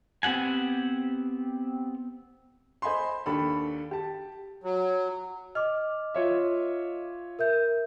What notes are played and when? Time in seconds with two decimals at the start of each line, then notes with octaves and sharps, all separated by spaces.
0.23 B3 C4 G4 F#5 G#5
2.82 C5 D#5 G#5 B5 C6
3.26 D#2 D4 A4 B5
3.91 G4 A5
4.64 F#3
5.55 D#5 D6 F6
6.15 F4 C#5 E5
7.39 A#4 E5 G6